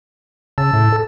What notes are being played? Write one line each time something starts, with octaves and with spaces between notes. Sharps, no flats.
C#3 A5 E6 A6
A2
A4